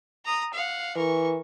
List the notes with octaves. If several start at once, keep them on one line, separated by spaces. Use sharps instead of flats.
A#5 D#6
F5 F#5
E3 A#4 C#6